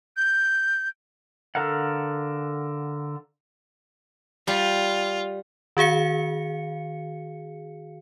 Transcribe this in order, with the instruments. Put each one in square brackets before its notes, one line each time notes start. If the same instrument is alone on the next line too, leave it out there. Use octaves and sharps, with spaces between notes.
[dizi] G6
[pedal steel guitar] D3 A4 A#4 F5 F#5
[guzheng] G3 [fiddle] F4
[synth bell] D#3 F#4 G#4 F5 C#7